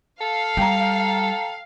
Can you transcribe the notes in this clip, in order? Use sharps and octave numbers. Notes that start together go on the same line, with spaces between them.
A4 F5
G3 G5 A#5